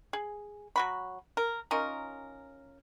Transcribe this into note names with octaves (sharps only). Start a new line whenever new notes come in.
G#4
F#3 F#4 B5
A#4
C#4 D#4 F4 A#4